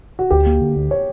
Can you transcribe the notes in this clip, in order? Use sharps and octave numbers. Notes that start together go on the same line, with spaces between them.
F#4
D2 G4
A#3
D3
D2
C#5